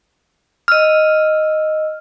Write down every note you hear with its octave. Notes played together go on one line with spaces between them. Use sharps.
D#5 E6 F6